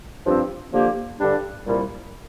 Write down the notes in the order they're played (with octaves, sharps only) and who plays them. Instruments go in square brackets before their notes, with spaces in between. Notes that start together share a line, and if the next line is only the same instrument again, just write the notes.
[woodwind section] G2 F3 C4 G4
D3 F3 A#3 G4
G2 D3 G3 D4
C2 A#2 G3